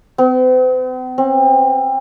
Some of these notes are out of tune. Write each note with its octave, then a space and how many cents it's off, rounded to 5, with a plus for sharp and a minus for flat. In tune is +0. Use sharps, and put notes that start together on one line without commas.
C4 -45
C4 +35